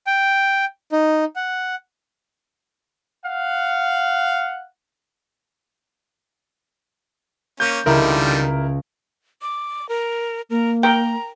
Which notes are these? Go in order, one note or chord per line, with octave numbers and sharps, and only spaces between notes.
G5
D#4
F#5
F5 F#5
A#3 C#4 G6
C#2 D3 D#3 G3 E4 A#4
D6
A#4
A#3 A#4
A#4 G5 A#5